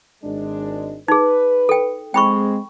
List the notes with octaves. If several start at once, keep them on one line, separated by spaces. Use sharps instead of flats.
G#1 G#3 D4
D#4 G#4 B4
A4 G5
G#3 C4 G5 B5 C#6